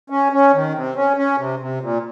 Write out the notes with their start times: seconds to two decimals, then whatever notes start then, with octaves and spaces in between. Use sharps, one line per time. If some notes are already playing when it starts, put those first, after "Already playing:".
0.10 C#4
0.32 C#4
0.53 D#3
0.74 C3
0.96 C#4
1.17 C#4
1.38 C3
1.59 C3
1.81 A#2